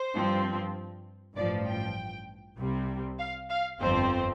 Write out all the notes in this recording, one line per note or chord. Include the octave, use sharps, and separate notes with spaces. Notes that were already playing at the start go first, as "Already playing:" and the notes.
Already playing: C5
G2 F3 C4
A1 G2 F3 D5
G5
C2 C3 G3 C4
F5
F5
G1 F2 F3 C4 C5